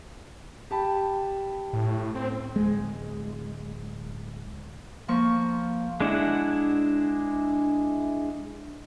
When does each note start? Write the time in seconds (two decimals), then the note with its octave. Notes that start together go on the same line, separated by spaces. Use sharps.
0.71 G4 A5 B5
1.73 A2
2.15 C4
2.56 D1 G#3
5.08 F3 A#3 C#6
6.00 G#3 D4 E4 F#5